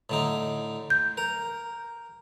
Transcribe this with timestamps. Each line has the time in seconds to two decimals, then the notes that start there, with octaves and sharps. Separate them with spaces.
0.10 A2 D3 D#4
0.90 G6
1.17 A#4